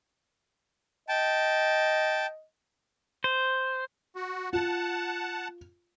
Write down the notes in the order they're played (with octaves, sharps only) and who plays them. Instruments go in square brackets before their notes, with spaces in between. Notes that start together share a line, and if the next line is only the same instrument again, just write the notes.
[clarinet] D#5 [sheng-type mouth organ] G5 A5
[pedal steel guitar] C5
[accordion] F#4
[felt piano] F4 [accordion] F#5 A5